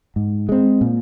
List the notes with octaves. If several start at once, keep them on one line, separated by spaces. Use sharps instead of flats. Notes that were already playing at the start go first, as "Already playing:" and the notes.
G#2
G#3 C4
A#2